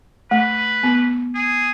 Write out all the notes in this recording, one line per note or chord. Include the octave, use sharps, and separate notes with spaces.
A3 B4
B3
G#4